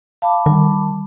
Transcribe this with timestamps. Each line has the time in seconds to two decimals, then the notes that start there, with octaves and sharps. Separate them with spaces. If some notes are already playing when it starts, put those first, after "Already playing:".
0.22 F5 A5 B5 D6
0.46 D#3 G3